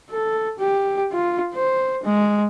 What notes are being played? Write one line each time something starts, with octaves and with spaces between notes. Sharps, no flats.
A4
G4
F4
C5
G#3